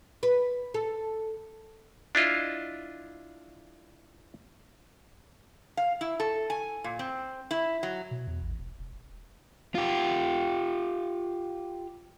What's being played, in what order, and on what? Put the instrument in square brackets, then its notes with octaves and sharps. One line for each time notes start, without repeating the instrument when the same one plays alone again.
[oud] B4
A4
[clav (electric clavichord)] D4 E4 F4 D#5
[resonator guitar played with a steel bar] F5
E4
A4
G#5
A#2
C4
E4
F#3
[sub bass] B2
E2
A1
E1
E1
[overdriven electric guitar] F4 G4